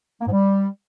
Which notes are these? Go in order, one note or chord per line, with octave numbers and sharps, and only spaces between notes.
A#3
G#2
G3